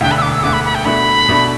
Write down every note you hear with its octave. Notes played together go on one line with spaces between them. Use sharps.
E1 D2 D3 G5
B5
E6
D6
E6
E1 D2 D3 D6
B5
B5
G5
B2 A3 D4 B5
B2 A3 D4